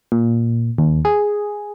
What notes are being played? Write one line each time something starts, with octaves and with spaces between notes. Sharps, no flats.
A#2
D#2
G#4